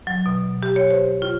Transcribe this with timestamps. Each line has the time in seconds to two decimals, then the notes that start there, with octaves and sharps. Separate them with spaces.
0.07 F#3
0.26 B2
0.63 G4
0.76 C#5
0.91 C5
1.22 F4